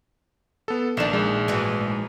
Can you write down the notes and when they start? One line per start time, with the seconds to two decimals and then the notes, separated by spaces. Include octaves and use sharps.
0.68 B3 A4
0.97 A#1 D#3 D4 E7
1.13 A#1 G#3
1.48 G#2 E3 F#4